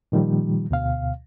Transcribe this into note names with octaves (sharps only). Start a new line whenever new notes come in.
A#2 D#3 F3 G3
D2 B2 F5